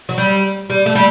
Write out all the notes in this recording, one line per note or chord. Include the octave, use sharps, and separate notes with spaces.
F#3
G3
G3
A3
G3